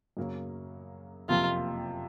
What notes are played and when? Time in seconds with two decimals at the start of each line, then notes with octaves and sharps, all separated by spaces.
0.17 F#2 C#3 F#3 A#3
1.29 F#1 F2 C3 F3 A#3 F4